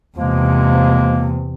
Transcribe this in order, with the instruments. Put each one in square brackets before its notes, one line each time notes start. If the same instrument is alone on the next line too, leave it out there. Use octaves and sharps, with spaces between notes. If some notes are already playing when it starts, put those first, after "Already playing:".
[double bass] E2 C3 [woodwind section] F3 G#3 A#3